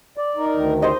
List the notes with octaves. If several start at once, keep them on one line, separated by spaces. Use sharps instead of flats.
D5
D#4 A#4
D2 D#3
C5 D#5